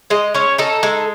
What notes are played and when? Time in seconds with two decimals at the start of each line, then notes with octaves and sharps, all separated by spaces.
0.10 G#3 D#5
0.35 C#4 C#5
0.58 D#4 A4
0.83 G#3